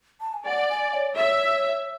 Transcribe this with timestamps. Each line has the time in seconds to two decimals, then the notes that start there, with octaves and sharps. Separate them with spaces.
0.21 A5
0.34 G#5
0.46 D5 F#5
0.69 G#5
0.94 C#5
1.17 C#5 E5